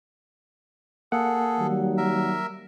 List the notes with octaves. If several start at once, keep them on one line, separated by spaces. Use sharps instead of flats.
A#3 G#4 A4 F#5
D#3 F#3 G3
A#4 E5